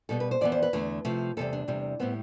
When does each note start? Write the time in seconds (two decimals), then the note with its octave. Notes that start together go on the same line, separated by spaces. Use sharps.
0.09 B2 G3 B3 A4
0.20 B4
0.31 C5
0.41 F2 E3 B3 D5
0.52 C5
0.62 B4
0.73 E2 D3 A3
1.05 C3 F3 A3
1.37 E2 C3 G3 A4
1.53 D4
1.68 E2 C3 G3
1.99 A2 G3 B3 C4